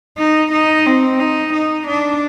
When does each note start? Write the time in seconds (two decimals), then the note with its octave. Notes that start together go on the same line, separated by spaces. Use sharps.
0.17 D#4
0.52 D#4
0.86 C4
1.19 D#4
1.53 D#4
1.87 D4